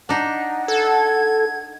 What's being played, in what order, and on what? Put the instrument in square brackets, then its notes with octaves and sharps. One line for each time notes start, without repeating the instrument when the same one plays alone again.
[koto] D4 D#4 [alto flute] F#5
[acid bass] A4 [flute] G#6